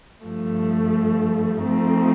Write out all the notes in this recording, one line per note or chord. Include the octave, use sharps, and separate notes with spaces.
G2 F3 A3
F3 A3 C4 D#4